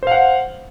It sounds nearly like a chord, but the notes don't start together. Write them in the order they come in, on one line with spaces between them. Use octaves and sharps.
C5 F5 F#5